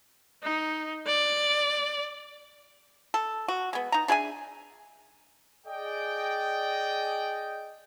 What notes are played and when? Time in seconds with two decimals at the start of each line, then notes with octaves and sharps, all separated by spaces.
0.43 D#4
1.07 D5
3.14 A4
3.48 F#4
3.73 G#3 B3
3.92 D#4 A#5
4.08 D4 G#4 E5 G#5
5.67 G#4 D5 D#5 G5